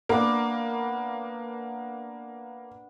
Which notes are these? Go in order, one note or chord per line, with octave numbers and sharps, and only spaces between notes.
A#3 B3 D4